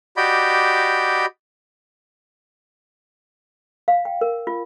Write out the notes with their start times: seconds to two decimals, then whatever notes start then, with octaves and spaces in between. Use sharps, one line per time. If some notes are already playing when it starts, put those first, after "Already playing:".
0.17 F#4 G4 D5 D#5 B5 G6
3.88 F5
4.05 G5
4.21 A#4
4.47 F4